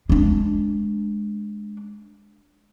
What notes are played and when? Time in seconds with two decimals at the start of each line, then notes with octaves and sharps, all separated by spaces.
0.09 G#3 D4